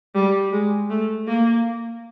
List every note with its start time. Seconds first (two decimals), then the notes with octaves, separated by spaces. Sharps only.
0.15 G3
0.52 G#3
0.90 A3
1.27 A#3